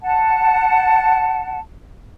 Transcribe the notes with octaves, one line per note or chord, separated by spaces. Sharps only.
F#5 A5